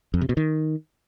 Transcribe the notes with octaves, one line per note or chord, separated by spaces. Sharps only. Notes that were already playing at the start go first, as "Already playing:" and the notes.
F2
C3
B2
D#3